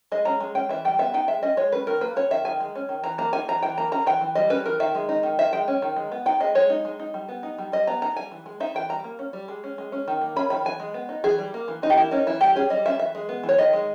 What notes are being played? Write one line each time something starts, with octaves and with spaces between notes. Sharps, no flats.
G#3 D#5
C#4 A#5
G#3
C#4 G5
E3 E5
G3 G5
B3 E5
D#4 G5
G#3 E5
C#4 D#5
G#3 C#5
C#4 B4
D#3 A#4
A#3 B4
C#4 C#5
D#3 E5
D#3 G#5
G#3
C#4
D#3
E3 A#5
A#3 A#5
D#4 G#5
E3 A#5
E3 G5
A#3 A#5
C#4 A#5
E3 G5
E3
G3 D#5
C#4 B4
E3 A#4
D#3 E5
G#3
D#4
D#3
D#3 E5
G#3 G5
C#4
D#3
G#3
B3
D#4 G5
G#3 D#5
G#3 C#5
D#4
G#3
D#4
G3
B3
D#4
G3
G3 D#5
B3 A#5
D#4 A#5
G3 G#5
E3
G#3
D#4 E5
E3 G5
G3 A#5
A#3
C#4
G3
G#3
C#4
G#3
C#4
D#3
A#3
C#4 B5
D#3 B5
E3 G#5
G#3
B3
D#4
E3 G#4
G3
A#3
E3
E3 D#4
G4
A#3 E4
C#4 D#4
E3 E4
G3 G4
C#4 G#4
G3 D#5
C#4 E5
E3 E5
G#3
B3
E3
C#5
D#3 D#5
G#3